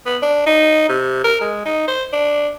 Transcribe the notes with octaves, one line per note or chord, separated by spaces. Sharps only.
B3
D4
D#4
C3
A#4
G#3
D#4
C5
D4